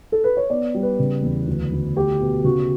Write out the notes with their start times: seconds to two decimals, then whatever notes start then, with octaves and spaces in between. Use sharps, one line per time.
0.12 A4
0.24 B4
0.37 C#5
0.50 B3 D5
0.74 G3
0.83 B4
0.99 C#3
1.23 E2
1.47 D2
1.72 D2
1.96 A3 G4
2.21 B2
2.44 C#3 F#4